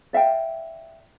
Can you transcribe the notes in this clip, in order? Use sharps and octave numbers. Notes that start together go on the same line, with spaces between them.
D5 E5 F5 G5